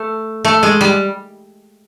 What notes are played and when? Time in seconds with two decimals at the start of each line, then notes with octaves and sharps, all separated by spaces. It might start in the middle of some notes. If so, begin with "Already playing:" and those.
Already playing: A3
0.45 A3
0.63 G#3
0.81 G3